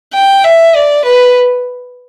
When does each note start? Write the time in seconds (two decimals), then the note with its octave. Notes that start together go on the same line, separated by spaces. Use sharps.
0.14 G5
0.44 E5
0.75 D5
1.05 B4